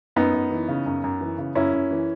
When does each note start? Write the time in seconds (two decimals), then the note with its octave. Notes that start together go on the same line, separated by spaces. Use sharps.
0.16 F#2 B3 D#4
0.34 F#2
0.51 E3
0.68 C#3
0.86 F#2
1.04 F#2
1.21 E3
1.38 C#3
1.55 F#2 C#4 E4
1.73 F#2
1.91 E3